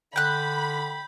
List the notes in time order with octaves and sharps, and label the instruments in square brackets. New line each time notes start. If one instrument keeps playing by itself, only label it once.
[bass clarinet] D3 [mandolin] G5 F#6 [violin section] B5 [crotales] G6